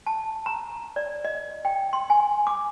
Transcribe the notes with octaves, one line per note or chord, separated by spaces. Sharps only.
A5
A#5
D5
D#5
G5
C6
G#5
D6